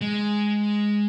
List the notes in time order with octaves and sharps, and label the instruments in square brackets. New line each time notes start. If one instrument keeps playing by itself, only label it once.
[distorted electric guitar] G#3